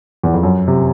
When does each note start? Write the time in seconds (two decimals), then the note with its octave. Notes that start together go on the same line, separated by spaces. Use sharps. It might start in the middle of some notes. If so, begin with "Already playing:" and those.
0.23 E2
0.34 F2
0.43 F#2
0.67 C3